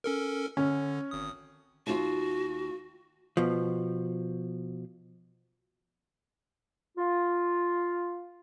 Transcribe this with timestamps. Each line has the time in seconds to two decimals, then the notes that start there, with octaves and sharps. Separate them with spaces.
0.04 C#4 A4 A#4
0.57 D3 C#4
1.11 G#1 D#6
1.87 D#2 F4 F#4
3.37 B2 F3
6.96 F4